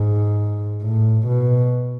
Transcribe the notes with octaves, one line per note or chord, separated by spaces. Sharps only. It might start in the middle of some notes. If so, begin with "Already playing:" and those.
Already playing: G#2
A2
B2